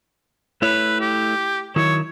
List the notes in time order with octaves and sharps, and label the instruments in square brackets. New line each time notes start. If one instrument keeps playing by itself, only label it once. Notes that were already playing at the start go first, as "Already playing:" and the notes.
[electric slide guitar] A3 E4 C#5 [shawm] B4
[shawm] G4
[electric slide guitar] D#3 F#3 E4 [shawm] C#5